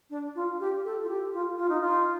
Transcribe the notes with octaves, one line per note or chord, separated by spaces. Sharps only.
D4
F4
G4
A4
F4
G4
F4
F4
D#4
F4